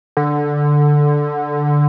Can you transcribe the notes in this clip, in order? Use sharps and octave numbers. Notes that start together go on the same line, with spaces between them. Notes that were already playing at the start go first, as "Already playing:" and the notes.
D3